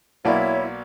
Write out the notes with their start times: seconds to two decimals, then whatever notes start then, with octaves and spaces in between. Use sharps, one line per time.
0.25 B1 A#3 E4 C#5 D5